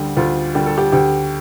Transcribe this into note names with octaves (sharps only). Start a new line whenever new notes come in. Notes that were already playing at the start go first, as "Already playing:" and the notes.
Already playing: D2 D3 G3 G4
D2 F4
D3 G3 G4
A4
G4
D2 G4